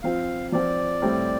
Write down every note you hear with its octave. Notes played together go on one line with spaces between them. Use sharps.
F3 C4 F4 F5
F3 C4 F4 D5
A2 G3 C4